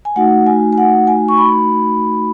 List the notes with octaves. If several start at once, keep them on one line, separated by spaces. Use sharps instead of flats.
G#5
A3 D#4 F#4 F#5
G#5
G#5
F#5
G#5
C#6
B5